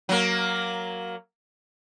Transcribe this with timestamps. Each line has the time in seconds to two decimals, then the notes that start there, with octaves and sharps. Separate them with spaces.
0.09 F#3 A#3